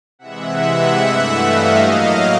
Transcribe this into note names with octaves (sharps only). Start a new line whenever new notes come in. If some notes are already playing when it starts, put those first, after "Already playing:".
C3 E3 G#3 E5 F#5
G2 E3 A3
D#5 F5
A2 F#3 A#3